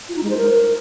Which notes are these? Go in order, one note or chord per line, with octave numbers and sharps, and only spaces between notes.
F4
D#4
G#3
C5
A#4